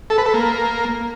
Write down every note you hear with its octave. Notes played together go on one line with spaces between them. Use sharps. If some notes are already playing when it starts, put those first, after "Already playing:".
A4
B4
A4
A#3